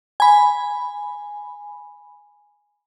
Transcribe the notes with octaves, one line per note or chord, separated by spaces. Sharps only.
G#5 B5